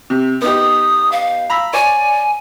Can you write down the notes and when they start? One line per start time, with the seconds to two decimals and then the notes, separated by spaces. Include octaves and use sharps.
0.10 C3
0.42 B3 D#4 G4 D#6
1.12 F5
1.50 A#5 B5 E6
1.73 C#5 D5 G#5